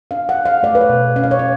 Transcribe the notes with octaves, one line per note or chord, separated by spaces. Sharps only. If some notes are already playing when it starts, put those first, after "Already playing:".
D4 F5
F#5
D4
F5
A3 D5
B4
C#5
B2
C#4 F5
D5
C#5
C#4 D5